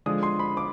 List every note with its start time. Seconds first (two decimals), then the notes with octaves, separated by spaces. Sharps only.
0.06 D3 F3 G#3 D4 D#6
0.23 C6
0.39 B5
0.57 D6